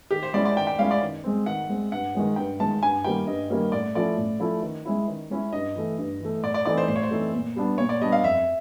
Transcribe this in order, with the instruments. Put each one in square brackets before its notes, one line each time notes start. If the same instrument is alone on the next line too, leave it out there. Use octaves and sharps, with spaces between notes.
[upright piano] D#3 [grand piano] G4
[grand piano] C5
[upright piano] G#3 C#4 E4 [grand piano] D5
[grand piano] D5
[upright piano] D#3 [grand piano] G5
[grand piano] G5
[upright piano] G#3 C#4 E4 [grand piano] F5
[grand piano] D5
[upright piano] D#3
G#3 C4
[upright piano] D#3 [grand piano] F#5
[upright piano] G#3 C4
[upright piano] G2 [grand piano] F#5
[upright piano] D#3 G#3 C#4
[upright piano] G2 [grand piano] G5
[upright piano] D#3 G#3 C#4 [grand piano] A5
[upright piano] G2 [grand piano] G#5
[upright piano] D#3 G3 A#3 C#4 [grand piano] G5
[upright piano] G2 [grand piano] D#5
[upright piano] D#3 G3 A#3 C#4
[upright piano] A2 [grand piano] D5
[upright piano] F3 A3 C#4 E4 [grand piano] D5
[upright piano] A2
F3 A3 C#4 E4
D#3
G#3 C#4 E4
D#3
G#3 C#4 E4
[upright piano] G2 [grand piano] D#5
[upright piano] E3 A3
G2
E3 A3
[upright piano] A2 [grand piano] D5
[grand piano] D5
[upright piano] E3 A3 C4 D#4 [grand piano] D5
[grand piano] C5
[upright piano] A2 [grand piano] C5
[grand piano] C#5
C5
[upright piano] E3 A3 C4 D#4
A#2
G3 B3 D4
[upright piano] A#2 [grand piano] C#5
[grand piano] D5
[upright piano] G3 B3 D4 [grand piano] D#5
[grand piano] F5
[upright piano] F2 [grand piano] E5